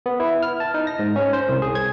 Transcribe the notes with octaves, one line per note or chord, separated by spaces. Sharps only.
B3
E4
F6
A5
D#4
A#6
G#2
C#4
C5
C2
G#4
G#6